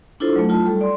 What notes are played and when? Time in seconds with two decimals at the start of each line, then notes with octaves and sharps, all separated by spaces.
0.20 D4 E4 F4 A4 C5
0.36 F#3 A3
0.49 D#4 F4 A5
0.66 G3 A4
0.81 D5 C6